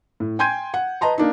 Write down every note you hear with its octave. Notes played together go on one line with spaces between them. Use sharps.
A2
G5 G#5 C6 G6 G#6 D#7
F#5
B4 D#5 A5 A#5 C6
A#3 D4 D#4